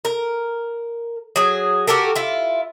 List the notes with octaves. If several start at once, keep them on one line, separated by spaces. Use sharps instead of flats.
A#4
F#3 G#4
F#4 G4 A4 A#4
E4 F4